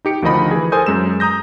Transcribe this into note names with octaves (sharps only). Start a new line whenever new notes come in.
D#4 G4 C#7 D7
D2 D#3 F3 D#4 D#5 B5
E3 G#4
A4 A#4 C5 G#5 D#6 G6
F#2 G#3 E6 E7
A#5 D#6 G6 A#6